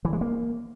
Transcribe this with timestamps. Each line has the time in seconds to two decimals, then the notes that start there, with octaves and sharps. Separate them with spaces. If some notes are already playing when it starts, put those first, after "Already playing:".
0.05 E3
0.13 G#3
0.21 A#3